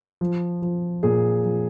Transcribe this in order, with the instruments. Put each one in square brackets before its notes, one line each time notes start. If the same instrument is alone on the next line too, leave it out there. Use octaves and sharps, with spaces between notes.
[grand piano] F3
F3
A#2 G#4
F3